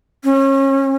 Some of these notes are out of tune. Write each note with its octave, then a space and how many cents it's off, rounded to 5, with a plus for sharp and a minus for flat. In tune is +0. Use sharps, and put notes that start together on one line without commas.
C#4 -30